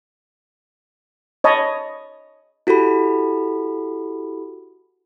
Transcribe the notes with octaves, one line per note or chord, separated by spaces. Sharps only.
C#5 D#5 A5 B5
E4 F#4 G4 A4 B5